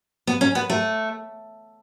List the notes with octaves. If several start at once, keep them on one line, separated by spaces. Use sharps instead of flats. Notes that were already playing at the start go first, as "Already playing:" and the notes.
B3
C#4
B3
A3